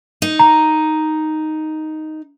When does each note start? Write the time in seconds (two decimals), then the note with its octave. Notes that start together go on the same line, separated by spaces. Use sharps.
0.22 D#4
0.39 A#5